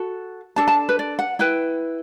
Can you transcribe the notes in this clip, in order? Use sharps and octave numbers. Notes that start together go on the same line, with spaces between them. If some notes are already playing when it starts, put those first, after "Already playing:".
Already playing: F#4 A4
D4 A4 A5
A5
B4
D5
F#5
E4 B4 G5